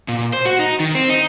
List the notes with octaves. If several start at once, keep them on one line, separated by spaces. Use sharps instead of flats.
A#2
C5
F#4
D#4
D#3
C4
D#4